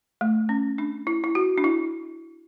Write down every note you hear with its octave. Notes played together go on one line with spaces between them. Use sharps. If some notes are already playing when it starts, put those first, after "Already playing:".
A3
C#4
D4
E4
E4
F#4
D4
E4